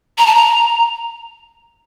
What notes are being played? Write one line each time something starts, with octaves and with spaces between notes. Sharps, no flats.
A#5
A5
A#5